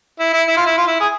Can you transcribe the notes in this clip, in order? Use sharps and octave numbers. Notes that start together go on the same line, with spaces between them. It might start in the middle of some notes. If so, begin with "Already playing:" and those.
E4
E4
E4
F4
E4
F4
E4
G#4